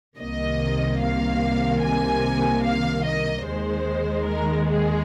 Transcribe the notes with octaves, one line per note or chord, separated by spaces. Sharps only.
C2 C3 D#3 A#3 D#5
F5
G#5
F5
D#5
D#2 D#3 G#3 C5
A#4
G#4